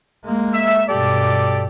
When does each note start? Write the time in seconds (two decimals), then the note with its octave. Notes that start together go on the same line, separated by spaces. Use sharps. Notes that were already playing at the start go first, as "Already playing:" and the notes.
0.25 G#3 A#3
0.53 E5
0.88 G2 B2 G4 A4 D5